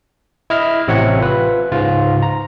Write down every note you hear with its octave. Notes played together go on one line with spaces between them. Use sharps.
E4 D#5 F6
A1 C3 C4 C#5 F#5
F4 B4
C#2 G#2 F4
A#5